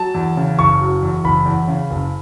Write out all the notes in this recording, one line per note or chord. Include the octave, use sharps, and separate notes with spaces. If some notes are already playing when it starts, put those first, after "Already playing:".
Already playing: F#3 A5
E2
C#3
F#1 C#6
F#3
E2
F#1 B5
E2
C#3
F#1